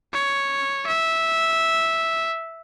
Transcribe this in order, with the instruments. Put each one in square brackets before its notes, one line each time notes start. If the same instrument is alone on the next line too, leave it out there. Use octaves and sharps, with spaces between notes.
[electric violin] C#5
E5